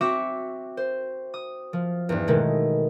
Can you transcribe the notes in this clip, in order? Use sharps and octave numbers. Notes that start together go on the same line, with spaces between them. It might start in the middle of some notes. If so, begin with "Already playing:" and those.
C4 F#4 E5 C#6 D6 E7
C5
D#6
F3
E2 G2
B2 D#3 G#3 A3